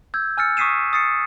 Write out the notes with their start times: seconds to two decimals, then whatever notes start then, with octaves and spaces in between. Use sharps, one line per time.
0.14 E6 G6 G#6
0.37 G#5 E6 F6 A6 C#7
0.57 C#6 D#6 B6 C7 D#7 E7
0.93 D#6 A6 C7 C#7